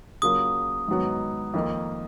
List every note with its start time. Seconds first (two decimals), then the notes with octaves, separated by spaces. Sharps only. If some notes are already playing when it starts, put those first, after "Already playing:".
0.22 C#3 F#3 A#3 F4 A#4 D#6
0.88 G#2 D#3 F#3 B3 F#4
1.54 F2 D#3 A#3